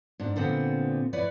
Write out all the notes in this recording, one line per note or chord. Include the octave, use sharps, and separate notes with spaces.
G#2 D4
A#2 D3 B3 C4
E4 B4 C#5 D5